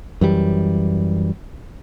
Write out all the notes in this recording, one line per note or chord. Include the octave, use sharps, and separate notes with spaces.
F#2 E3 G3